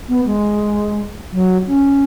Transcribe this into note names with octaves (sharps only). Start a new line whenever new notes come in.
B3
G#3
F#3
C#4